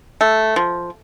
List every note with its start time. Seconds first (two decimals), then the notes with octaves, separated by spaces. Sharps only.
0.21 A3
0.56 F3